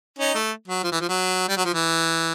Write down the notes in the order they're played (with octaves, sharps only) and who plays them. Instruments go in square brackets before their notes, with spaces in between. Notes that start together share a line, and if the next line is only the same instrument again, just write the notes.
[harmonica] C#4 D#4
A3
F#3
F3
E3
F3
F#3
G3
F#3
F3
E3